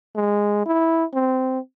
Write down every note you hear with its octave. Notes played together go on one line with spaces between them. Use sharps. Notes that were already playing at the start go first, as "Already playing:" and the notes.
G#3
E4
C4